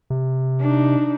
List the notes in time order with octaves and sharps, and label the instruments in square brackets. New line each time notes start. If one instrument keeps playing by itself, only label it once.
[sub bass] C3
[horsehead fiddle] D4 D#4